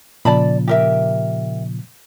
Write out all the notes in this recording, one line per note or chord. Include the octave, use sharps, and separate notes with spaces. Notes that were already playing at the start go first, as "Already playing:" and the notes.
A#2 C#3 F3 D5 A5 B5
G4 A#4 E5